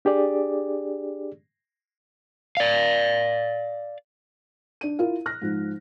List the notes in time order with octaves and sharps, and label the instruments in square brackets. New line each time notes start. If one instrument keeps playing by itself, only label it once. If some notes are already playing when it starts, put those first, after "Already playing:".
[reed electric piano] D4 G4 G#4 D5
[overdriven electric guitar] D5 F5
[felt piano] D4 D#7
E4 F4 A#4 F5
F6 F#6 A#6
G#2 F3